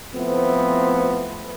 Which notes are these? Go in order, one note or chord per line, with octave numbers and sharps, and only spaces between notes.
F3 A3 B3 C4 E4